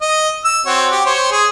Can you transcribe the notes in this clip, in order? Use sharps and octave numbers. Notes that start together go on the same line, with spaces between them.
D#5
E6
C4 F#4 C#5
G4
C5 C#5
G#4